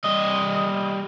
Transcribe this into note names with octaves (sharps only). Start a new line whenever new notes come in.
G3 D#5